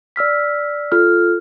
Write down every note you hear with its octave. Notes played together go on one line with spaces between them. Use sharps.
D5 E6 F6 B6
F4 A4 F6